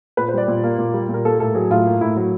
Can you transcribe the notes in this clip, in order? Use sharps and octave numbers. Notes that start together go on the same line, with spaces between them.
A#2 B4
C5
G3 D5
A#2
A#3
A#2
G3
A#2
A#4
A#3 A4
A2 A4
F#3 G#4
A2 F4
A#3
A2 E4
F#3